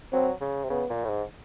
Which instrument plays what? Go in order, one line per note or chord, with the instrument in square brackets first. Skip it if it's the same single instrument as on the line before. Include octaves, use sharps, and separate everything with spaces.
[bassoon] F#3 [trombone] C4
[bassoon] C#3
C3
[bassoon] C#3 [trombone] B3
[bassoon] A#2
A2
G#2